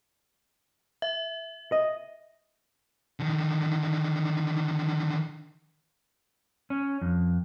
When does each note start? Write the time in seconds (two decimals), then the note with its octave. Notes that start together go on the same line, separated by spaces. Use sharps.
1.02 E5
1.72 D#5
3.20 D3 D#3
6.70 C#4
7.02 F2